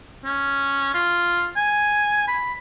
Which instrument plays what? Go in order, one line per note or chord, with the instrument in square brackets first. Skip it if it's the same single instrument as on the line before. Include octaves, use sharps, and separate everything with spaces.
[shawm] C#4
F4
G#5
B5